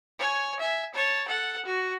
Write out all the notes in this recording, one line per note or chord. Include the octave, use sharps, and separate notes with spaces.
C#5 G#5
E5 G#5
C#5 A5
A4 F#5
F#4